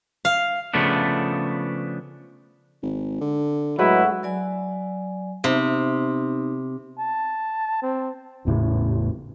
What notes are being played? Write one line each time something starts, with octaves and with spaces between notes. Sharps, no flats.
F5
C#3 F3 A3 B3 D4
G#1
D3
A2 F#3 G#3 E4 F#4 B4 F#5
F#3 D5 G#5
C3 B3 D#4
A5
C4
G#1 E2 A2 C#3